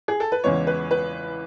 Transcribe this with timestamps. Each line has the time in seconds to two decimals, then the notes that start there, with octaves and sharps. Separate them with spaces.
0.08 G#4
0.20 A4
0.32 B4
0.44 E2 C#3 E3 G#3 B3 C#5
0.67 B4
0.91 B4